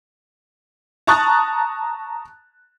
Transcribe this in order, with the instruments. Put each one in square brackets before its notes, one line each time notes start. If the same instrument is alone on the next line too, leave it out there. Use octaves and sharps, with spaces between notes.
[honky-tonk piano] A5 A#5 C#6 D#6 F#6 A6